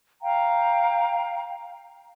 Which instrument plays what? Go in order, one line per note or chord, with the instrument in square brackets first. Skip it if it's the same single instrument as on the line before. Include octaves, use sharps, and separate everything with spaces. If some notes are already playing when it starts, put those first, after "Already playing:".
[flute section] F5 G5 A#5